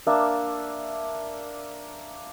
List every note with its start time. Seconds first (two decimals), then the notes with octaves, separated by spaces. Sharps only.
0.07 A#3 D4 E5